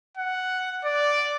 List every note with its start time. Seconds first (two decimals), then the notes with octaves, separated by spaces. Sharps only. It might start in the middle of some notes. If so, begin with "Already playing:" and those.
0.17 F#5
0.85 D5